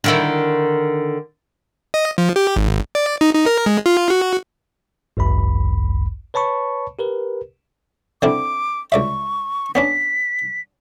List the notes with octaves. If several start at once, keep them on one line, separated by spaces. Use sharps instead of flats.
D3 D#3 E4
D#5
F3
G4
G#1
D5
D#4
D#4
A#4
G#3
F4
F#4
G#1 C#2 F#2 B5
B4 C#5 A5 B5 C#6
G4 A#4 B4
D3 C4 E4 D6
C#2 D5 E5 C#6
B3 C#4 D4 B6